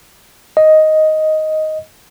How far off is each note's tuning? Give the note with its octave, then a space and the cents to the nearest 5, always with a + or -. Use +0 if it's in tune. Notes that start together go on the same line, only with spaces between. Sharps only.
D#5 +5